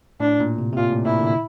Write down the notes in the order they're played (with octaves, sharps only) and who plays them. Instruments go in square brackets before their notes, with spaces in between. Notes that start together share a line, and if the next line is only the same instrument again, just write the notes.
[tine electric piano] A2 [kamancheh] D4
[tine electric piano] A#2
C3
C3
[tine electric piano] A#2 [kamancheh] F4
[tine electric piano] A2
[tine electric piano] A#2 [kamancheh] E4
[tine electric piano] D3